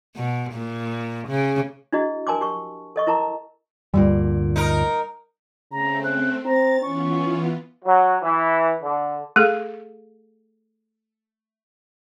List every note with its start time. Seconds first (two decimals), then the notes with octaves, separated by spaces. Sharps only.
0.16 B2
0.53 A#2
1.29 C#3
1.92 D4 E4 F#4 G#4 D#5
2.27 A#4 G#5 A5 C6 D6
2.41 G4 C#6
2.96 A4 D#5 C#6
3.07 E4 A#4 A5 A#5 D6
3.94 G1 D2 A#2 G3
4.56 D#4 A#4
5.72 C#3 A3 C4 A#5
6.04 F#6
6.45 C4 A#5 A6
6.82 E3 B3 C#4 F4 C#6
7.85 F#3
8.22 E3
8.81 D3
9.36 A3 G#4 A4